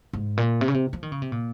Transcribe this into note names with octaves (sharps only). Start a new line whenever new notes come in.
G#2
A#2
C3
C#3
C3
F3
D#3
C#3
C3
A#2